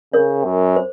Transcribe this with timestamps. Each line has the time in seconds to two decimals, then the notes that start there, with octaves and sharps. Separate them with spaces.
0.13 C#3 A#4 C#5
0.44 F#2
0.76 C5